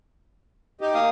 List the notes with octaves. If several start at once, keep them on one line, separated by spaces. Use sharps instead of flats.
D#4 G4
A#3 F5 D#6